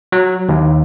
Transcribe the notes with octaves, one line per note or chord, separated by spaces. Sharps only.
F#3
D#2